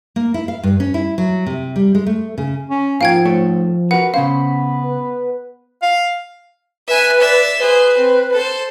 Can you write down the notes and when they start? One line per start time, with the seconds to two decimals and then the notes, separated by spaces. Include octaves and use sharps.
0.16 A#3
0.34 E4
0.48 F5
0.63 G2
0.80 C#4
0.94 E4
1.18 F#3
1.46 C3
1.76 G3
1.95 G#3
2.07 A3
2.38 C#3
2.70 C#4
3.01 G#2 F3 A#3 F4 F5 G5 G#6
3.25 A3 C#5
3.91 F#4 A#4 B4 F#5
4.14 C#3 B3 C#4 C5 F5 B5
4.84 B4
5.82 F5
6.87 B4 E5 G#5
7.20 D5 E5
7.59 G#4 B4 C5
7.97 C4
8.32 A4 C5